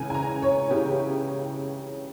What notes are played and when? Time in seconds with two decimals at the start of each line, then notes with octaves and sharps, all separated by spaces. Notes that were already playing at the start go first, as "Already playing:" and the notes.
Already playing: C#2 C#3 E3 G#5
0.10 G#5
0.15 A#5
0.42 C#5
0.70 C#2 C#3 E3 G4